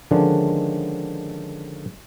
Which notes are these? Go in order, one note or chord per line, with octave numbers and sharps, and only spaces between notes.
D3 D#3 F3 G#3 C#4 D4